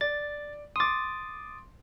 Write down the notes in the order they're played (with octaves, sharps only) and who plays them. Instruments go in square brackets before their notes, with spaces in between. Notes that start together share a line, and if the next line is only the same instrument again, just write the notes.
[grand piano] D5 [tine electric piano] A6
[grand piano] C6 D6 [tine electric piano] D#6 A6